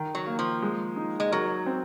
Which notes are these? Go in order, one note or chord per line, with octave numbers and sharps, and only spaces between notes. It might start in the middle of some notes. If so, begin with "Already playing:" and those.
Already playing: D#3
F#3
A#3
F3
G#3
D#4
G#3
F#3 A#4
C4